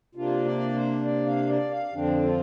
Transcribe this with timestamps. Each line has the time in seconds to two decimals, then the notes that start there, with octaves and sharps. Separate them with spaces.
0.15 C3 A#3 D4 F4
0.45 D5
0.75 C5
1.04 D5
1.27 F5
1.49 D5
1.71 F5
1.93 F2 D3 F3 C4 D4
2.23 F4